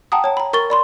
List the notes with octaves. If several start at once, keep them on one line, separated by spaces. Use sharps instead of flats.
F#5 G5 A5 A#5 D#6
C#5 A5
A#5 B5
A#4 C#6 A6 G7
D5 B5 C6